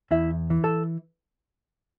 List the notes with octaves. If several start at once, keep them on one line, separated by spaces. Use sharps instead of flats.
E2 E4 E5
E3
A4 A5